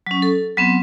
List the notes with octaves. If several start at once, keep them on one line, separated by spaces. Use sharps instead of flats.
F#3 C#4
A4
F#3 B3 C4